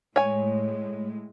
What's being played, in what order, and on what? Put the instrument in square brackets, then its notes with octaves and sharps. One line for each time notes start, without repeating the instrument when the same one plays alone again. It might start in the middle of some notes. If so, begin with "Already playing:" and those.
[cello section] A2 G#3 [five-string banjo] C#5 G#5